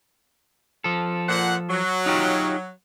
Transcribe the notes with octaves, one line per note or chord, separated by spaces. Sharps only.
F3 A4
A#2 C5 F#5
F#3
D#4 F4 G4